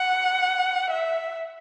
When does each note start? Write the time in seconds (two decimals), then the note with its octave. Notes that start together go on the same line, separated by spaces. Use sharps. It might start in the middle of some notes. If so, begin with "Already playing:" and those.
Already playing: F#5
0.90 E5